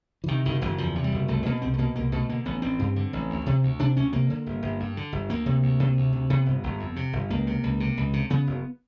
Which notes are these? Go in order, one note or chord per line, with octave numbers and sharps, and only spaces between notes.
E3
C3 D#3
F#1 D#3
F#1 E3
E2 F3
C3
G3
F#1
C2 A3
B2 A#3
C2 C4
A3
B2 A#3
C2 A#3
B2 A3
D3 A#3
A1 B3
A1 C4
G2
D3
A1
D2
C3
D2
C3 D4
D2 C#4
C3 A#3
D3
G1
G1
G2
D3
G1
D2 A#3
C3
D2
C3
D2
C3
C3 B3
G1
G1
F2
C3
G1
C#2 A#3
C3
C#2
C3
C#2
C3
C#3 B3
F#1